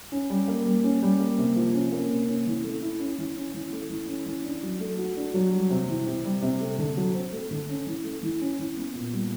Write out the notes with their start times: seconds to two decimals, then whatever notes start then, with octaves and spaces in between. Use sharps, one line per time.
0.12 C#4
0.30 G3
0.48 A#3
0.66 G3
0.84 C#4
1.02 G3
1.20 A#3
1.38 C3
1.56 F3
1.74 C#4
1.92 A#3
2.10 C3
2.28 C#4
2.46 E3
2.64 A3
2.82 E4
3.00 C#4
3.18 E3
3.36 C#4
3.54 E3
3.72 A3
3.90 E3
4.08 C#4
4.26 E3
4.44 D4
4.63 F#3
4.80 A3
4.98 F#4
5.17 D4
5.34 F#3
5.52 G3
5.71 C3
5.88 E3
6.06 C3
6.25 G3
6.42 C3
6.61 A3
6.78 D3
6.97 F#3
7.15 C4
7.33 A3
7.51 D3
7.69 C#4
7.87 E3
8.04 A3
8.23 E3
8.41 C#4
8.59 E3
8.76 B3
8.95 A#2
9.13 G3